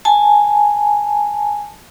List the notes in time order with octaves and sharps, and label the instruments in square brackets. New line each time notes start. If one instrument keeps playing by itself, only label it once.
[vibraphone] G#5 A5